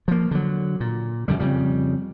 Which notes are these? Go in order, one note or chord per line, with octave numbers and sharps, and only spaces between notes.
F3 A#3
D3 F#3
A#2
F#2 A2 D3 G3
F2 C#3 G3